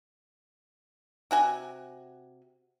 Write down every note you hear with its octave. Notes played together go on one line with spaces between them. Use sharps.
C3 F#4 G#5